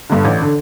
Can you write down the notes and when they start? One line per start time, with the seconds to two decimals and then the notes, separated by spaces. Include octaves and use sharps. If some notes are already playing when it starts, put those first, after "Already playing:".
0.10 G2 D3
0.25 A1
0.42 D3